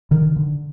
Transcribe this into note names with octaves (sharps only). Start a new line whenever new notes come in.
D3 D#3
D3